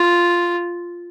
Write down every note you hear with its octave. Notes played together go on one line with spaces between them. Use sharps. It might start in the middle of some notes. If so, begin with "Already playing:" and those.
Already playing: F4